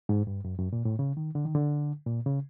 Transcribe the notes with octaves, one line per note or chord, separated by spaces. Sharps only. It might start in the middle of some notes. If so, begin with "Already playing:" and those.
G#2
G2
F#2
F#2
A#2
A2
C#3
D#3
D3
D#3
D3
A#2
C#3